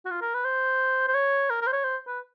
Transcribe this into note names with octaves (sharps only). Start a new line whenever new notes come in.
F#4
F4
A#4
B4
C5
C5
C#5
A#4
A#4
C5
C#5
C5
B4